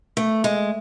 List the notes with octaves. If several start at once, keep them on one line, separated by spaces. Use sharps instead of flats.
A3
G#3